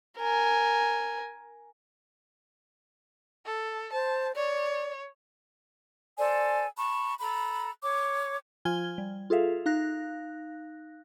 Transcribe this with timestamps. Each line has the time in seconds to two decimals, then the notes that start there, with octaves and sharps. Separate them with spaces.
0.18 A#4 G#5
3.46 A4
3.93 C5 A5
4.36 C#5 D5
6.17 A4 C5 D5 G#5
6.77 A5 B5 C#6
7.21 A4 A#5 B5
7.82 C#5 D6
8.65 F3 F4 G#5 F6 G#6 G7
8.98 G3
9.30 F4 G#4 A4 E5 F5
9.66 D#4 F5 F#6 A#6